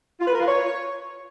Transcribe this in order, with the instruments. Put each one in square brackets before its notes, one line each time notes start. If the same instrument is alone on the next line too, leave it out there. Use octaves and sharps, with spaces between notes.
[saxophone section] F4
B4
A#4
F4
C#5